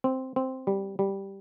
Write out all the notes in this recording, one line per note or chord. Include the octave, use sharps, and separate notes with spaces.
C4
C4
G3
G3